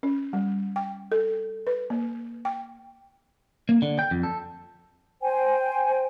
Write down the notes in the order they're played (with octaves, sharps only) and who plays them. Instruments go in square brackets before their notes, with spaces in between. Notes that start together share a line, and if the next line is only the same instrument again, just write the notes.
[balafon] C#4
G3
G5
A4
B4
A#3
G5
[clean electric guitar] A#3
D3
G5
F2
A4
[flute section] C5 G5 G#5